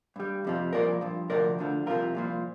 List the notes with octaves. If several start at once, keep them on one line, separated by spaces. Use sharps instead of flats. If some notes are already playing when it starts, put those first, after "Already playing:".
G2 G3
F2 C3 F3
C2 A#2 F3 A#4 D5
G2 F3
D2 C3 F3 A#4 D5
D2 D3 F3
C2 C3 F3 F4 A#4
C2 A#2 F3